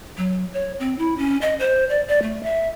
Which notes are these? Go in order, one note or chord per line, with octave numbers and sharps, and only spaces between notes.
F#3
C#5
C4
E4
C#4
D#5
C5
D5
D5
A3
E5